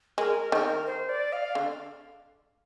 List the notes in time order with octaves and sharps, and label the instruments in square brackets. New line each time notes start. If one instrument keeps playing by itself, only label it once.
[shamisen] G#3 [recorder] A#4
[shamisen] D#3
[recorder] C5
D5
F5
[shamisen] D3